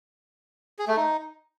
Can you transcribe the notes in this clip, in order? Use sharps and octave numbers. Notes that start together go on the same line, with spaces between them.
G#4
A3
D#4